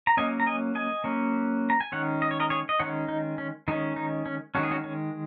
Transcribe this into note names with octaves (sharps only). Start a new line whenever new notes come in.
A#5
F#3 A#3 C#4 D#5 G#5
A#5
D#5 G#5
D#5 G#5
F#3 A#3 C#4
A#5
G#5
D#3 G#3 C#4 C#5 F#5
D#5
C#5
A#4 D#5
G#4 C#5
D#5
D#3 G#3 C#4 C#5 F#5
D#4
C#4
D#3 G#3 C#4 D#4
D#4
C#4
D#3 G#3 C#4 F#4
G#4
C#4 F#4
C#4